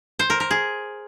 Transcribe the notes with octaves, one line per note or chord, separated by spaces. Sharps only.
C5
A#4
A#4
G#4